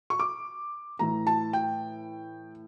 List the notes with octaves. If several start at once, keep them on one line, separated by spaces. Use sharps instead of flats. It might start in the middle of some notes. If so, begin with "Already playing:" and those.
C#6
D6
A2 E3 A#5
A5
G5